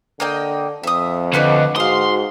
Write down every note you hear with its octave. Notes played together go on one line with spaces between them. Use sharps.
D3 A#3 D#5 G5
F2 E5 D#6
D2 D4 B4 D#5 F#5
G#2 F#4 F5 C6 D#6